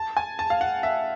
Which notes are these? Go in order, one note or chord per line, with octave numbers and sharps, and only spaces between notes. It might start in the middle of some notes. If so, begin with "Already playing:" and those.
Already playing: A5
G#5
A5
F5
F#5
E5